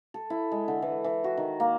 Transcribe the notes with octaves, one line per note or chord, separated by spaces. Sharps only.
A4
E4
G#3
D3
E3
E3
F#4
D#3
A#3